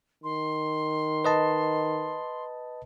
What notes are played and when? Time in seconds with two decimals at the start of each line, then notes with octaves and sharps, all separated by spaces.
0.24 D#3 C6
1.24 B4 D#5 A5